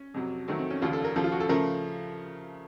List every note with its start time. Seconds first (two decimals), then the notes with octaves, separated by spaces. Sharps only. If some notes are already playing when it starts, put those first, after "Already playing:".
Already playing: C#4
0.14 F2 C3 F#3
0.48 F2 D#3 F#3 A3 C4
0.59 C4
0.70 C#4
0.82 F1 D#2 C#3 F3 F4
0.93 A4
1.05 A#4
1.16 D#2 C#3 F3 A4
1.24 F4
1.32 F#4
1.40 A4
1.49 C#3 F3 A3 A#4